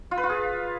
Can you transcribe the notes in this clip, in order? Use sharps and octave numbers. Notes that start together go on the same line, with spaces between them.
F4
B4
F4
G#4